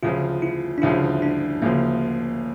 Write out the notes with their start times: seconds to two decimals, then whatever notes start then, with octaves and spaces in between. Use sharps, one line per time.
0.03 D2 C#3 F3 F4
0.42 E4
0.78 D4
0.82 D2 C#3 F3 E4
1.22 D4
1.62 D2 C#3 F3 A#3